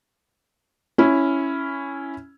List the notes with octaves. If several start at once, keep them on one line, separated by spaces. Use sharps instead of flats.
C#4 E4